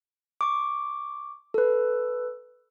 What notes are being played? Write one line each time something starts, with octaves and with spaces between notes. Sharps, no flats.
C#6 D6
A4 B4